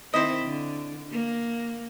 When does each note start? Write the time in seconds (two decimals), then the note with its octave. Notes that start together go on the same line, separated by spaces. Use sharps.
0.14 D#3 C4 E4 C5 D#5
0.44 D3
1.11 A#3